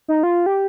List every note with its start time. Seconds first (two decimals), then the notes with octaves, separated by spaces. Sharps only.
0.08 D#4
0.23 F4
0.46 G4